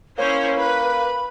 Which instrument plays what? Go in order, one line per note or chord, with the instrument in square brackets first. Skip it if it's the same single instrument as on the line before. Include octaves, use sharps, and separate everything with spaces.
[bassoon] A#3 [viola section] C#4 E4 C5 [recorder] C#5
[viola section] B4 [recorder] B5